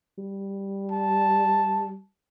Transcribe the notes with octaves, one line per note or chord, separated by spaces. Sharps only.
G3
A5